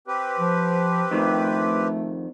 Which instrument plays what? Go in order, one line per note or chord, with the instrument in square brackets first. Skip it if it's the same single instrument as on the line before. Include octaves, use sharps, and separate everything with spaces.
[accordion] C4 G4 B4
[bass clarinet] F3
[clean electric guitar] F2 D#3 [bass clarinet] A3